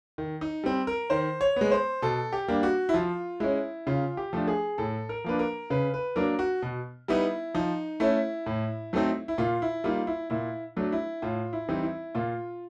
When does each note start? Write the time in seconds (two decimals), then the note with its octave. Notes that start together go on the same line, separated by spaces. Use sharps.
0.18 D#3
0.41 D#4
0.64 G3 C4
0.87 A#4
1.10 D#3 C5
1.41 C#5
1.56 G#3 B3
1.71 C5
2.02 B2 A4
2.33 G4
2.48 G3 A#3 D4
2.63 F#4
2.89 E4
2.94 F3 F4
3.40 G#3 C#4 E4
3.87 C#3 F4
4.17 G4
4.33 F3 A3 D4
4.47 G#4
4.78 A2 A4
5.09 A#4
5.24 F3 A#3 D4 B4
5.39 A#4
5.70 C#3 B4
5.94 B4
6.16 F#3 A#3 D4 A#4
6.39 F#4
6.62 B2
7.08 G3 B3 D#4 E4
7.54 F3 D#4
8.00 A3 C#4 E4
8.46 A2
8.93 F#3 A3 C4 D#4
9.28 E4
9.38 A#2 F4
9.62 E4
9.84 G3 A#3 D#4 F4
10.07 E4
10.30 A#2 E4
10.76 F#3 A3 D4
10.92 E4
11.22 A2 F4
11.53 E4
11.69 E3 G3 C4 D#4
11.84 E4
12.15 A#2 F4